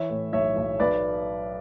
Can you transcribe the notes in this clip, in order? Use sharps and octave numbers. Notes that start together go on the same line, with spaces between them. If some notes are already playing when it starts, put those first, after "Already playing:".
Already playing: E3 C#5 E5
A2
B1 C#5 E5
B1
B1 B4 D5